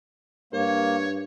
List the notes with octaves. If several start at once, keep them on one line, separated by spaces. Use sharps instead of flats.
G2 A#3 A#4 C#5